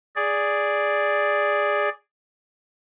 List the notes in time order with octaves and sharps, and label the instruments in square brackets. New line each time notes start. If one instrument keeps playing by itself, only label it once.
[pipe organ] G#4 D5